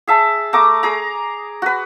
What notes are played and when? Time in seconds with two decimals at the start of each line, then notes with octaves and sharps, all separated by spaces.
0.07 G#4 E5 A5
0.53 A3 A#5 D6 D#6
0.83 G#4 A#5
1.62 F#4 B4